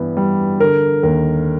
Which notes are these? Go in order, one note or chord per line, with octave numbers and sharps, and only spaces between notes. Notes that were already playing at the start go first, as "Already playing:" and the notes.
Already playing: G2 E3 B3
G3
D3 A#4
D#2 A#4